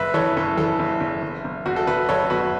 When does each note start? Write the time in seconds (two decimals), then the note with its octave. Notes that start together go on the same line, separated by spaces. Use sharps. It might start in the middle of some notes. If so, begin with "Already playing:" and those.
Already playing: F#1 B4 E5
0.14 E3 A4 C#5
0.37 F#1 A4
0.57 E3 A4
0.79 F#1
1.01 F#1
1.22 F#1
1.44 F#1
1.66 F#1 F#4
1.76 A4
1.87 F#1 F#4 B4
2.09 F#1 A4 C#5
2.30 F#1 F#4 B4